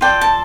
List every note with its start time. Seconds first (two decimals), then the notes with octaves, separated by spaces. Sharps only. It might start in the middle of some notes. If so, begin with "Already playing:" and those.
0.01 F4 A4 D5 G5
0.21 A5